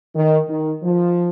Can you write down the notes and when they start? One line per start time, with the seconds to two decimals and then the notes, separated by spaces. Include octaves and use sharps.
0.14 D#3
0.48 D#3
0.83 F3